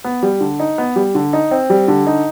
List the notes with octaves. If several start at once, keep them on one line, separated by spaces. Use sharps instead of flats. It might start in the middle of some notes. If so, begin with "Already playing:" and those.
B3
G3
D3
D#4
B3
G3
D3
D#4
C4
G3
D3
D#4